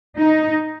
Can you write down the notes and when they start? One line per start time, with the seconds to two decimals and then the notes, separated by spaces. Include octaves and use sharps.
0.19 D#4